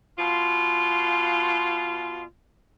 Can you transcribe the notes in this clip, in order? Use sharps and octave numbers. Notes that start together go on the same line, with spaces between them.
B2 F4